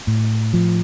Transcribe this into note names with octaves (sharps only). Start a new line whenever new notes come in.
A2
F3